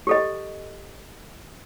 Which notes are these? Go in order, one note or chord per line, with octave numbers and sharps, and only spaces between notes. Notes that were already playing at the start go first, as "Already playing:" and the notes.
G4 A4 D#5